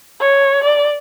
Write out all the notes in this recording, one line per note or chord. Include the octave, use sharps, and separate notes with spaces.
C#5
D5